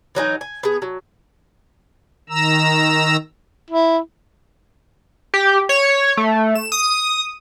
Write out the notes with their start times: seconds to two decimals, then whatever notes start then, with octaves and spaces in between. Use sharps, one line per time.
0.15 E3 F#3 D#4 G#5
0.41 G#5
0.63 B3 G#4
0.82 F#3
2.29 D#3 A#5 E6
3.71 E4
5.34 G4
5.69 C#5
6.17 A3
6.55 E7
6.72 D#6